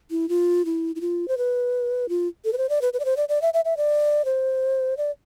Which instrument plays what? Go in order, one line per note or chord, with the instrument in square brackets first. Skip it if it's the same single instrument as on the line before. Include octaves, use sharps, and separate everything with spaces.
[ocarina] E4
F4
E4
E4
F4
C5
B4
F4
A4
B4
C5
D5
B4
B4
D5
C5
D5
D5
E5
E5
E5
D5
C5
D5